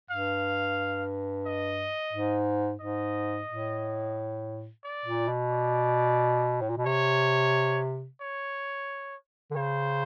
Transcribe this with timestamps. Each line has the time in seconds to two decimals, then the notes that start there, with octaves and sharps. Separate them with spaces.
0.10 G2 F5
1.46 D#5
2.13 G#2
2.81 G#2 D#5
3.48 A2
4.84 D5
5.06 A#2
5.28 B2
5.51 D5
6.61 A2
6.69 A#2
6.78 B2
6.86 C3 C#5
8.21 C#5
9.51 D3
9.56 C#3 C5